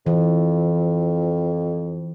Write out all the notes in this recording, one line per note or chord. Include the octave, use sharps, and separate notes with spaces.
F2 E3